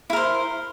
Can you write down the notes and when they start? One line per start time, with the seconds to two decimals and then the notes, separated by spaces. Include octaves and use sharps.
0.10 E4
0.13 A#4
0.16 C5